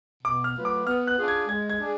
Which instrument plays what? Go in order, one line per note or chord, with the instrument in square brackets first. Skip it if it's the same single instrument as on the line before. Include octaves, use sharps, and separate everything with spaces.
[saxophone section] B2 [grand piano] D6
[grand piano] F6
[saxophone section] F#3 A3 F4 B4
[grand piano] D6
[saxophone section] B3 [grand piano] F6
[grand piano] F#6
[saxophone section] D4 F4 G#4
[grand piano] G#6
[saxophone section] G#3 [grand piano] G#6
[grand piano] G#6
[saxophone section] D4 G#4